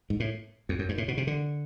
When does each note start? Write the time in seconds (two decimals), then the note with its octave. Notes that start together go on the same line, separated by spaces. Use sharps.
0.10 G#2
0.20 A2
0.69 F2
0.79 F#2
0.89 G2
0.98 A2
1.08 B2
1.17 C3
1.27 D3